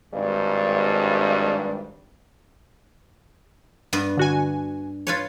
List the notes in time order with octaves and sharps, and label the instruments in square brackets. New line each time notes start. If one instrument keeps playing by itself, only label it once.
[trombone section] G#1 G2
[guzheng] G2 B3 B4
[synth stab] D3 F#4 G#5
[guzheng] F4 B4 C#5